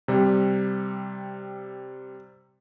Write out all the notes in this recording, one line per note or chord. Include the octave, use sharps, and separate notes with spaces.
C3 G3